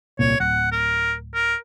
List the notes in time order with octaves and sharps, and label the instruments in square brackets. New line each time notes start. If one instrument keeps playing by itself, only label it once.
[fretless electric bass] D#1 C2 A#2 [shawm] C#5
[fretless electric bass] D1 [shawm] F#5
[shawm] A#4
A#4